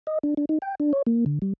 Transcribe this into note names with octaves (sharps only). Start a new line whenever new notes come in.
D#5
D4
D4
D#4
G5
D4
C#5
A#3
D3
G3